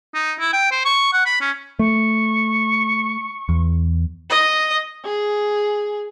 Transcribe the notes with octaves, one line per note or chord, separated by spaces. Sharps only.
D#4
E4
G5
C5
C#6
F#5
B5
C#4
A3 C#6
E2
D#5
G#4